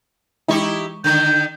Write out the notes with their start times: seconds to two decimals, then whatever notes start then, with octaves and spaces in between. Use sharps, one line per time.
0.48 E3 G#3 D#4 E4 G4 C#6
1.04 D3 D#3 G6